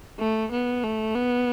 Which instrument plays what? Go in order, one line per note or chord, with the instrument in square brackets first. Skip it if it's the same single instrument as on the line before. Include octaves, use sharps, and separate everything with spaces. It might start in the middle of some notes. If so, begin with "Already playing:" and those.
[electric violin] A3
B3
A3
B3